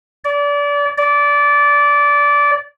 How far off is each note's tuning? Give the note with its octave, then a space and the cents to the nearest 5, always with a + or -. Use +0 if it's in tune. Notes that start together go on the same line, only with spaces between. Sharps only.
D5 -30
D5 -20